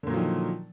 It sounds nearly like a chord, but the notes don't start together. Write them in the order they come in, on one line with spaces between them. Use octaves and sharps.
D3 A#2 F#3 F3 D#3